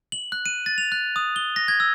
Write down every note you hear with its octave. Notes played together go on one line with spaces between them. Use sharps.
F#7
F#6
D#7
A6
F7
F#6
D#6
G7
A#6
G#6
E6